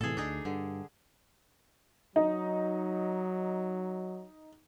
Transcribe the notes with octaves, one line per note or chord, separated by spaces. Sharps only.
A2 C3 E3 G#4 A4
D2 D4 D#4 G#4
G2 D3
F#3 D#4